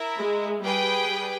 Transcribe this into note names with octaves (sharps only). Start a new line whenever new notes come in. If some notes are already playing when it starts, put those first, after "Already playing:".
Already playing: E4 A#4 E5
G#3
G3 G#4 B4 G5
G3